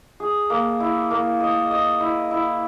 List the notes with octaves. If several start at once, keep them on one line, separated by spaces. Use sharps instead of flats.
G#4
A#3
E4
A#3
D#5
D#5
E4
E4